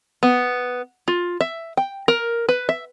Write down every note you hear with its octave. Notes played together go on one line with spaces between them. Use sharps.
B3
F4
E5
G5
A#4
B4
E5